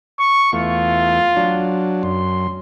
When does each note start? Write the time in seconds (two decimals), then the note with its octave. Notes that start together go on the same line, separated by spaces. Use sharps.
0.19 C#6
0.53 E2 A3 F4
1.36 F#3 D4
2.03 F#2 C6